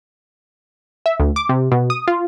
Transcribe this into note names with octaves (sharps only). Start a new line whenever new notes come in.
E5
D2
D6
C3
B2
D#6
F4